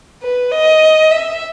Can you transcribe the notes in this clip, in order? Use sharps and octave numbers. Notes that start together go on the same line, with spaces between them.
B4
D#5
E5